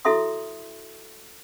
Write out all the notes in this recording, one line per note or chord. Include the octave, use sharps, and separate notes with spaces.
E4 F#4 A4 E5 C6 D#6